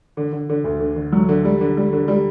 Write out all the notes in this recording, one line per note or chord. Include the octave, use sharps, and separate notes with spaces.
D3
D3
D3
D2
D3
D3
F#3
D3
G3
D3
G3
D3
G3